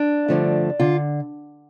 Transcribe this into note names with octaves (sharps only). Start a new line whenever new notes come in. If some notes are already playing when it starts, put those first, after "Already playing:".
Already playing: D4
G2 D3 F3 A3
D3 F4